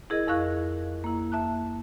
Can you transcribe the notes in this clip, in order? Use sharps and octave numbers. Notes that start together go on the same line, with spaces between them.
E4 G#4 A#4 D#5
F2 E4 A#4 F5 C#6 F#6
A#3 E4
E5 A5 F#6